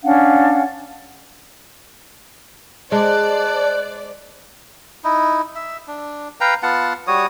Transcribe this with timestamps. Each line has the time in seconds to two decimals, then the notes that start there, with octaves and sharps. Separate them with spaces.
0.03 C#4 D4 F5 F#5
2.92 G#3 C5 D5 A5 F#6
5.04 D#4 E4
5.55 E5
5.88 D4
6.41 B4 F5 G5 A#5
6.63 B3 F4 F#5 A5
7.07 G3 F#4 C#5 D#6